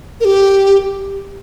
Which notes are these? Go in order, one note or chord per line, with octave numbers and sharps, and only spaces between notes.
A#4
G4